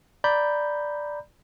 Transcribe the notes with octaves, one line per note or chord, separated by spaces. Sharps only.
D5 A#5 B5 G6